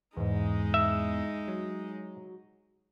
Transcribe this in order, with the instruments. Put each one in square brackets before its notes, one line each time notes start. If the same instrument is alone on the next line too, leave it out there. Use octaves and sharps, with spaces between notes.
[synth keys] E2 G#2 [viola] G#3 D#4
[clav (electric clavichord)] E5
[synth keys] F#3